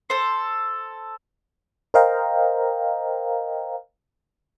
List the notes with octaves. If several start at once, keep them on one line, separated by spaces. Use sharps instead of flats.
A4 C5
A#4 C5 D#5 F5 G5 A#5